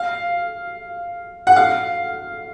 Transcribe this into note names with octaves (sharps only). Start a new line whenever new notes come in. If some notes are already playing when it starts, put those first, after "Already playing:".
Already playing: F5
F#5
F5